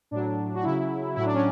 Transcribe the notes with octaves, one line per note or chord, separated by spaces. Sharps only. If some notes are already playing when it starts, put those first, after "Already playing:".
A2 F#3 D4
F#4
C#3 F#3 E4
A2 F#3 E4
D4
C#4